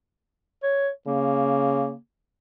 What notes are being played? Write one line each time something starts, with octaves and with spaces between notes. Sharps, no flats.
C#5
C#3 A#3